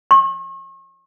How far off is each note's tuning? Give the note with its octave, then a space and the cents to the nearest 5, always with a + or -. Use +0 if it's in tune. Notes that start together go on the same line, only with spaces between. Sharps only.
C#6 -40